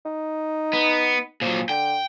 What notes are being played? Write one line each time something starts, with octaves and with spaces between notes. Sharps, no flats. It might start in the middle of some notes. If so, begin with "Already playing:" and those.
D#4
B3
A#2 F3 F#3
D3 G5